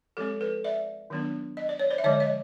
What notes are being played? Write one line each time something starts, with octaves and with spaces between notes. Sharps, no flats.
F3 G#3 C4 G4 A4
A4 B4
D5 E5
D#3 F#3 B3 D4
D#5
D5
C#5
C5 D5
E5
D3 F3 G#3 C#5 D#5
C#5 D#5